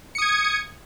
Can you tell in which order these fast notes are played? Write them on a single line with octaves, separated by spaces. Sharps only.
C#7 D#6 G#6